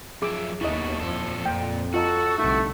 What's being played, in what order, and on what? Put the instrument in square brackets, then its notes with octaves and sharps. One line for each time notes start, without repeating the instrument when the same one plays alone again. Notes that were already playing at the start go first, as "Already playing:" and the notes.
[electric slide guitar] F#2 F3 E5 [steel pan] G#4 D6
[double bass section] D#2 B3 [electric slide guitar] C#3 A3 F#4 [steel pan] E4 D#5
[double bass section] F2 F3 [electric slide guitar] A#2 A4
[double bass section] F2 [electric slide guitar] A#2 [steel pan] G5
[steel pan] F4 D#5 A#5 [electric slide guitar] F#4 [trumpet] A4
[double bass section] C2 D3 [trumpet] A3 [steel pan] D#4